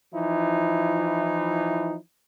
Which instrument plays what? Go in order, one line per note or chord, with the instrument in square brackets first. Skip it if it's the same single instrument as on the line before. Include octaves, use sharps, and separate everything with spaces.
[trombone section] E3 F3 D#4 E4